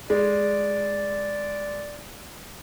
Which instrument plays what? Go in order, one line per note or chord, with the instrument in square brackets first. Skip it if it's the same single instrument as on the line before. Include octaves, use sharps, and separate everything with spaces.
[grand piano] G#3 [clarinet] D5